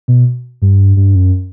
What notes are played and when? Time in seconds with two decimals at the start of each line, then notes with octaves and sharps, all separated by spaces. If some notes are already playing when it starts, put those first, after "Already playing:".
0.08 B2
0.62 G2
0.97 G2
1.15 F#2